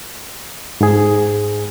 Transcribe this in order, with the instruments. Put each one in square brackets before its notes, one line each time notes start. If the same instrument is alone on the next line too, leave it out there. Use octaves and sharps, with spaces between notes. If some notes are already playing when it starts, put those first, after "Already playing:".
[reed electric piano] G#2 G#4